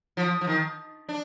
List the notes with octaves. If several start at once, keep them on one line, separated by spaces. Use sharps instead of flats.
F3
F3
D#3
D4